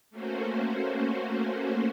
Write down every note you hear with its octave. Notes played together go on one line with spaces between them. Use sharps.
A3 A#3 C#4 F#4 C5